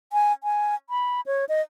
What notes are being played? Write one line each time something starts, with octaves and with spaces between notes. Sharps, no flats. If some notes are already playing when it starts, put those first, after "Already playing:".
G#5
G#5
B5
C#5
D#5